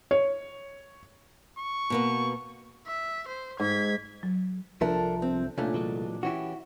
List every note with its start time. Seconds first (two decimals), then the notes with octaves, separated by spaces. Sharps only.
0.11 C#5
1.59 C#6
1.90 B2 A#3 B3
2.87 E5
3.28 C5
3.60 G#2 G#6 B6
4.23 F#3
4.81 C2 F3 D4 A4 A#4 E5
5.22 C4
5.58 C2 A#2 A3 C#4 D4
5.74 E3 F#3 G#3
6.23 E3 C#4 E4 F#4 G4